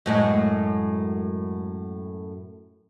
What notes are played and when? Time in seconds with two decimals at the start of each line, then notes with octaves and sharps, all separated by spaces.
0.06 F#2 A2 G#3